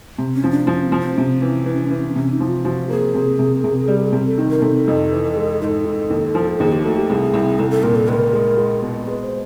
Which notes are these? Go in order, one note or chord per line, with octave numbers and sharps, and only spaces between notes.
C3
C#4
F3
D4
F3 C#4
C4
F3
C4
C3 C#4 D4
E3
E3
E3
C3 C#4
D#4
F3
F4
F3 F#4
A#3 G#4
C3
C3
C3
G3
C3
A4
D#3
A#4
C3 A4
F2
E3
G#3
G#2 A4 A#4
G#2
D#2
F3
D#2 G#4
G4
A3 F#4
G4
C2 G#4
C2
C2 A4
A4
A#2 A#4
A4
C#2 A#4 B4
G#3
G#3
B2
G#3 B4
C5